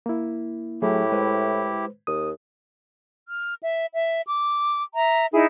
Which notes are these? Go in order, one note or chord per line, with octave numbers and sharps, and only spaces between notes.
A#3 E4
A2 F#3 A3 E4 G4 G#4
G#3 B4 C5
D#2 D#6
F6
E5
E5
D6
E5 A#5
D#4 E4 G#4